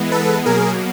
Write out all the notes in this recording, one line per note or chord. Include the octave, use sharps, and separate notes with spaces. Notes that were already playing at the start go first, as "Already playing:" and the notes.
Already playing: E3 G#3 B3
A4 B4
B2 F#3 A#3 G#4 A#4